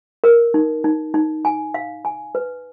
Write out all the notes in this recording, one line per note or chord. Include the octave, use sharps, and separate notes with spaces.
A#4
D#4
D#4
D#4
G#5
F5
G#5
B4